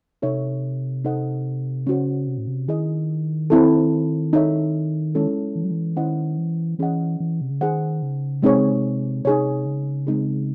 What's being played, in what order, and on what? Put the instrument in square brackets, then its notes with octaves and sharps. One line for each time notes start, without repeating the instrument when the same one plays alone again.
[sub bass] C3 [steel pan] D#4 A4 C#5 E5
[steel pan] D#4 A4 C5 D#5 F#5
[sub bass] C#3 [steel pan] C#4 F#4 C5
[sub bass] C3
A2
C3
[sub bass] D#3 [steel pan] E4 G#4 D#5
[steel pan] C4 E4 A4
D#4 A4 C#5 E5
G#3 C#4 E4 A4
[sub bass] E3
F#3
E3
[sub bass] D#3 [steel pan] C#4 E4 C5 D#5 F#5
[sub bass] E3
[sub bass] E3 [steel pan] C#4 G#4 D#5 F#5
[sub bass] E3
C3
C#3
[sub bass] D#3 [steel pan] D#4 G#4 C5 F#5
[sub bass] C#3
[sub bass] C3 [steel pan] G#3 C4 D#4 G#4 C#5
[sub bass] C#3
C3
[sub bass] C3 [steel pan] D#4 G#4 C#5
[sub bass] C#3
[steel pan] G#3 C4 D#4 G#4